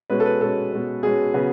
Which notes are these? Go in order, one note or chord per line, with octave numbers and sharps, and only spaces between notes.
B2 G#3 C#4 B4
A4
B4
B2 G#3 C#4 A4
B2 G#3 C#4
B2 G#3 C#4 G#4
C#3 F#3 B3